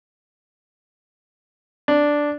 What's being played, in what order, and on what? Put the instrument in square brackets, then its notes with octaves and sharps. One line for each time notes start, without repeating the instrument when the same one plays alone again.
[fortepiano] D4